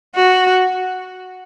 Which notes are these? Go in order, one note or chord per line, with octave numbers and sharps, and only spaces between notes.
F#4